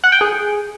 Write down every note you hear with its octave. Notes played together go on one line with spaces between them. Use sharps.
F#5
G5
G#4